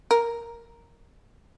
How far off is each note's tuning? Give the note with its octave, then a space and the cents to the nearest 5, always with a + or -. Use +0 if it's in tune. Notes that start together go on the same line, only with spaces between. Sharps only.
A#4 +0